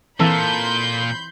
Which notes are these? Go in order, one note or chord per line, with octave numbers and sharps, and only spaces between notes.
A#2 E3 A#3 C4 A4 B5 C6 G6